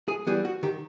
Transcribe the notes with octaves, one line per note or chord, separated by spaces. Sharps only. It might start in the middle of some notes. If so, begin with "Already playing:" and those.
G#4
E3 G3 B3 G#4
F#4
D#3 G4